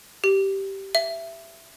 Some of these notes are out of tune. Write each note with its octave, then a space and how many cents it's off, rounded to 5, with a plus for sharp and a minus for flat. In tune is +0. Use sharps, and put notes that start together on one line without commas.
G4 -10
E5 +15